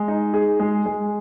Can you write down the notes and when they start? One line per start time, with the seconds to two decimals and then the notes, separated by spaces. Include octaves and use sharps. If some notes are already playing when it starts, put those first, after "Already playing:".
Already playing: G#3
0.08 D#4
0.34 G#4
0.60 G#3
0.86 G#3